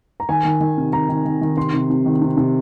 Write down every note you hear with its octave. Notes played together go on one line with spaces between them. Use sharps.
A#5
D#3 G#5
D#3
D#3
C3
D#3 A#5
D#3
D#3
D#3
C3 C6
C3
C3
D#3
C3
C3